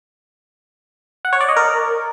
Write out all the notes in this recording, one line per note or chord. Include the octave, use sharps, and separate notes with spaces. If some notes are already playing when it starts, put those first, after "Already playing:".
F#5
C#5
D5
D#5
A#4